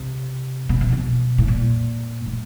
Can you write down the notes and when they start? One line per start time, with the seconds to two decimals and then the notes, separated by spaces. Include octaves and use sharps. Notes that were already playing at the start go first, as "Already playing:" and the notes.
Already playing: C3
0.69 B2
0.81 C3
0.92 B2
1.38 A2
1.48 A#2
2.26 A2